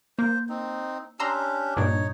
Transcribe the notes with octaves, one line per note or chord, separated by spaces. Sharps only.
A#3 C5
C4 D#4
C#4 D4 G4 A#5 C6 E6
G2 A#2 D4 D#4 C#5